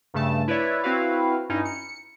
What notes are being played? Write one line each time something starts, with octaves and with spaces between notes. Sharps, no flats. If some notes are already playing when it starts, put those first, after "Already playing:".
G2 C#3 A3 A5
E4 B4 C#5 D5 E5
C4 E4 F#4 B4 F5
G2 C#4 D#4 E4
C#7